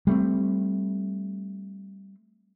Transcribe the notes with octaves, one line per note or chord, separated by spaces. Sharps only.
G3 A3 A#3 C4